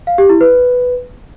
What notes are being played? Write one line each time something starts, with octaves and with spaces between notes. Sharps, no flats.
F5
G4
E4
B4